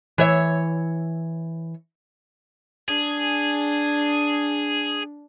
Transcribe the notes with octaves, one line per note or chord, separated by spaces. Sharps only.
E3 C#5 E5
D4 G#4